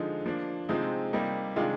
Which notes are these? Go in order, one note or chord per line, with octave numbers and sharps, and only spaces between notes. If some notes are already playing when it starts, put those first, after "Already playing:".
Already playing: D3 F3 G#3 D#4
F3 A#3 D4
C3 F3 G#3 C4 D#4
C3 G3 A#3 D#4
C3 D#3 G#3 D4 F4